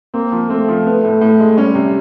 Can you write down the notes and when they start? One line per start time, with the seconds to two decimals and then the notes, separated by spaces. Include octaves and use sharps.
0.14 A#3 C4
0.32 F3
0.50 A3 C4
0.68 F3
0.86 B3
1.04 A2
1.21 A2
1.40 G#3
1.58 G3 C#4
1.75 C3